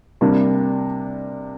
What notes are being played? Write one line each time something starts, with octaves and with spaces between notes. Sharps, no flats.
C3 G3 A#3 D4